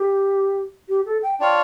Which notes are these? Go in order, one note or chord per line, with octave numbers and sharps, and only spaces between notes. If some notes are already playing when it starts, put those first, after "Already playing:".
Already playing: G4
G4
A4
G5
D4 F4 C#5 F5 G5